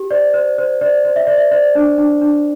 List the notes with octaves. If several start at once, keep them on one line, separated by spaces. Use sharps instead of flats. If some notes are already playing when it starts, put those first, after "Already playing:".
Already playing: G4
C5 D5
C5
C5
C5 D5
C5
E5
C5 D5
E5
C5 D5
D4
D4
D4